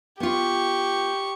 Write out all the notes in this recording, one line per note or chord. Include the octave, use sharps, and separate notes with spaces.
B3 F4 G4 C#6